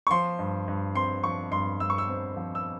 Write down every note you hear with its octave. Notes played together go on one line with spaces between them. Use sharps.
C#6
F3 C6
G2
G2
C4 C6
F3 C#6
G2 C6
G2 E6
C#6
E6
C4
F3
E6